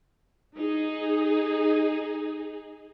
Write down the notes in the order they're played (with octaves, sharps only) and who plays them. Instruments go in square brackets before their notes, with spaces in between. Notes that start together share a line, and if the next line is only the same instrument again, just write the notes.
[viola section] D#4 G#4